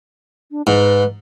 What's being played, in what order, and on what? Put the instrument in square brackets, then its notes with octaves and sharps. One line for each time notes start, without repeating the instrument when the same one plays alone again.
[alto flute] D4
[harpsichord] G#2 [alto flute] B4